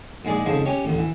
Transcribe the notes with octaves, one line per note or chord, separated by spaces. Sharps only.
A#1 G#2 G#3 G#4 D5
F2 G#2 C#3 F3 G#3
C#4 G4 C#5
A1 D2
E3